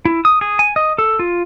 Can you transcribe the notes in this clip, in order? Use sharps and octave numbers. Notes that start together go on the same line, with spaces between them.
E4
D#6
G#4
G#5
D#5
A4
F4